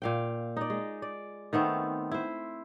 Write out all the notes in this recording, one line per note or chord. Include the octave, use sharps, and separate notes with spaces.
A#2 F5 G5
D#4 D5
G#3
D5
D#3 A3 B3 C4
E4 C5